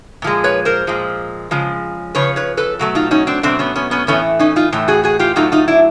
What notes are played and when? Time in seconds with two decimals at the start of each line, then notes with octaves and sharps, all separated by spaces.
0.22 A#2 F3 G#3
0.44 B4 C#5
0.65 A#4 C5
0.87 A#2 F3 G#3
1.51 C#3 F3 G#3
2.15 C#3 F3 B4 C#5
2.36 B4 C#5
2.57 A4 B4
2.79 B2 F#3 A3
2.95 D#4 F4
3.11 C#4 D#4
3.27 C4 D4
3.43 B2 F#3 A3 C4 D4
3.59 B3 C#4
3.76 B3 C#4
3.91 B3 C#4
4.07 A2 E3 A3 B3 C#4
4.39 C#4 D#4
4.56 D#4 F4
4.72 A2 E3 A3
4.88 F#4 G#4
5.03 F#4 G#4
5.19 F4 G4
5.36 A2 F#3 A3 D#4 F4
5.52 D#4 F4
5.68 D4 E4